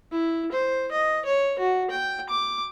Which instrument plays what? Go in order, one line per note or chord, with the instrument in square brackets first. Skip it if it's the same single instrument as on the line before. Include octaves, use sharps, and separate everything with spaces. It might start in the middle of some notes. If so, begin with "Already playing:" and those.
[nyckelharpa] E4
C5
D#5
C#5
F#4
G5
D6